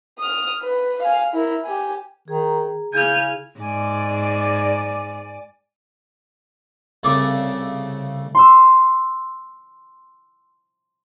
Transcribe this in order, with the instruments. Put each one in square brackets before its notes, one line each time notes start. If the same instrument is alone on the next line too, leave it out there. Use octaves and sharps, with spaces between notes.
[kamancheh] D#6 F6
B4
F5 G#5
E4 A#4
G4 G#5
[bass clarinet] D#3 [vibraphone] G#4 A#5
[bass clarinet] C#3 [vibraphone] E4 G#4 [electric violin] G#5 F6 [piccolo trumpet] G6
[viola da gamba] G#2 [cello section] D5 [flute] G#5
[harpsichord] C2 C#3 A3 D5 E5 D6
[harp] C6 E6